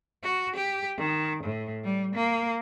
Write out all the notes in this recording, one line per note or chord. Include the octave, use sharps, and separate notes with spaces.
F#4
G4
D#3
A2
G3
A#3